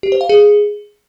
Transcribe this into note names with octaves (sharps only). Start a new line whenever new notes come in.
G4
C5
F5
G#4